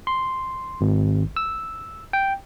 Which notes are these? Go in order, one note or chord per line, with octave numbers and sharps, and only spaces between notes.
C6
G#1
E6
G5